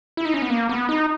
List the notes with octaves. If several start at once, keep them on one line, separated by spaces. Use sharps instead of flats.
E4
D#4
C#4
B3
A#3
B3
D#4